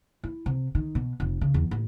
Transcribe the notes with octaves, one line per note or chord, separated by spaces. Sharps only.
E4
C3
D#3
B2
F1
C#3
E2
A1